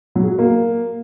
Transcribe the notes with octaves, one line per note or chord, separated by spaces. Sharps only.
F#3
G#4
F#4
A#3